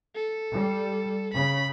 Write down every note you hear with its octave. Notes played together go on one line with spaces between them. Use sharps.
A4
G3
C#3 B5